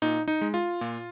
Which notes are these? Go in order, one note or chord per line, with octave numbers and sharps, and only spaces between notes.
A#2 D#4
D#4
G#3
F4
A#2